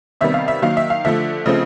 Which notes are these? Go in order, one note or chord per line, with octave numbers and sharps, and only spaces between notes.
C3 D#3 G3 B3 E5
F5
E5
D#3 F#3 A#3 F5
E5
F5
D3 F3 A3 E5
C#3 F3 A3 C4 D#5